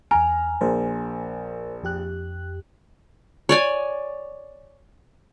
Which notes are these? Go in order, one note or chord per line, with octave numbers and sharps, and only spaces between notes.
E2 G#5 A#5 F6
A#1 A#4 C5
F2 G4 F#6
C#5 D5 G#5